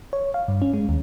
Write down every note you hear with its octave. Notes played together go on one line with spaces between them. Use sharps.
C#5
F5
G2
C#4
G#3
D#2